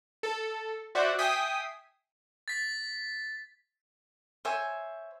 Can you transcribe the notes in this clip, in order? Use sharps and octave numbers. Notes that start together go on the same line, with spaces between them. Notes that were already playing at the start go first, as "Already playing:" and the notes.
A4
F#4 C5 D5 E5 F#5
E5 G5 G#5 D#6 B6 C7
A6 B6
C5 C#5 E5 G#5